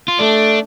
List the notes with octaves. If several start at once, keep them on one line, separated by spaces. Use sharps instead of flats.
F4
A3 D4